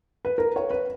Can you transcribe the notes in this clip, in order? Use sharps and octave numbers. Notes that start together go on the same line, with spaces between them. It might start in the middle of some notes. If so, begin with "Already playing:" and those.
B4
A#4
C#5
B4